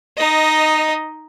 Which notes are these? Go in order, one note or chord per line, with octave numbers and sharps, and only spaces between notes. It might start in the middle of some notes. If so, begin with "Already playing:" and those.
D#4 D#5